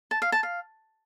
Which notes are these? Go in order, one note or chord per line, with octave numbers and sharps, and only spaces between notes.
A5
F5
A5
F5